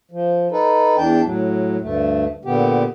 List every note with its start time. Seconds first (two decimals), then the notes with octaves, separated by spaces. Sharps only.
0.12 F3
0.52 D#4 A4 B4
0.98 E2 E3 D4 G5 A5
1.25 A2 F#3
1.82 D2 G2 A3
2.45 A#2 D3 B3 G4